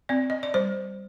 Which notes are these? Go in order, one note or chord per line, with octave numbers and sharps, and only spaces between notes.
C4 D5
D#5
D5
G3 C5